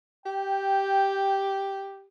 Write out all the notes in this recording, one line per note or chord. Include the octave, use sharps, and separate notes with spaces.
G4 G5